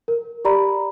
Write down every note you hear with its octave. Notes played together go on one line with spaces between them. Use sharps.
A#4
G4 D5 A#5 B5